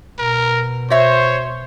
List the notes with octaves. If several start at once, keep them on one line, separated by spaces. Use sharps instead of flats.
B2 A#4
F#4 C5 C#5 E5